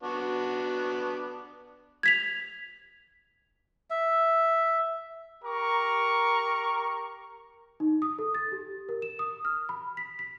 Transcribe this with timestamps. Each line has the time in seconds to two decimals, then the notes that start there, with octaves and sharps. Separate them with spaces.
0.03 B3 D4 F#4
2.03 G#6 B6 F7
3.90 E5
5.44 G4 A#4 A#5 C#6
7.80 D#4
8.02 D#6
8.19 A4
8.35 A6
8.52 G4
8.89 A#4
9.02 E7
9.19 D#6
9.45 F6
9.69 B5
9.97 B6
10.19 B6